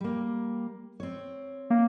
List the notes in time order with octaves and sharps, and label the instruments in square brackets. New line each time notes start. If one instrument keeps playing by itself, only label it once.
[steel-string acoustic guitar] G3 A#3
C4 C#5
[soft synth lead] A#3